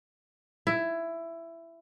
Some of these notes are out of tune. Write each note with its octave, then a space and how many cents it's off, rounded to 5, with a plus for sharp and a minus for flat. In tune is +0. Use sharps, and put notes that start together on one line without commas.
E4 +15